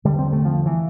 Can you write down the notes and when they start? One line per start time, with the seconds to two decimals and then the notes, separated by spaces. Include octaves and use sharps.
0.04 E2 D3 G3
0.19 C4
0.32 A3
0.45 F3
0.66 E3